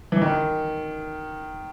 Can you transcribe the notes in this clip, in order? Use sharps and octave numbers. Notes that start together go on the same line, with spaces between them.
E3
D#3